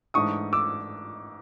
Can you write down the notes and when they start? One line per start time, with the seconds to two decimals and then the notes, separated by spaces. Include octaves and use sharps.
0.14 G#2 E3 A3 D4 C#6 D#6
0.53 D6 E6